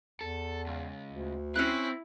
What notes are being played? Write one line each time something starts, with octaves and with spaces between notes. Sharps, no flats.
E2 A4
C#2
D2
C4 C#4 E4 C5 F#6